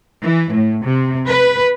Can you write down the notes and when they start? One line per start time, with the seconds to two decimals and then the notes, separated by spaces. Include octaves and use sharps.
0.19 E3
0.51 A2
0.83 C3
1.28 B4